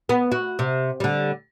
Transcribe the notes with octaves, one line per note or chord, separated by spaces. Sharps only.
B3
F#4
C3
D3 G3